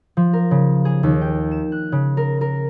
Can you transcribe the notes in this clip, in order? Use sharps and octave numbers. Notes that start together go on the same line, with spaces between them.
F3
A#4
C#3
G#4
D#2
G5
E7
F#6
C#3
A#4
A#4